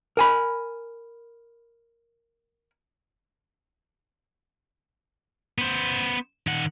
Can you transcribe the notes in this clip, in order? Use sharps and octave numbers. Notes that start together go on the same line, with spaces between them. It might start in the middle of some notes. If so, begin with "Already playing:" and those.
A#4 G#5 B5
B3 C5
D#3 F#5